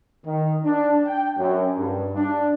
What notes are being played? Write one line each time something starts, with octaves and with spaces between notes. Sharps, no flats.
D#3
D4
G5
F#2
G2
D4